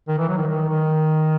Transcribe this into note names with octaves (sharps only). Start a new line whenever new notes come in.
D#3
E3
F#3
D#3
D#3
D#3